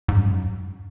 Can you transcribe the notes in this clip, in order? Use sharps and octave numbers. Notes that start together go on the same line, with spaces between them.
G#2
F#2